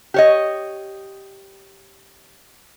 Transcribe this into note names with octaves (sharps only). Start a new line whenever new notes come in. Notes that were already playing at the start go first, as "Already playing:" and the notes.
G4 C#5 D#5